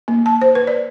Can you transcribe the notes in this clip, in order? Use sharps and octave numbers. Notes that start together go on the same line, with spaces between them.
A#3
A5
C5
B4
D5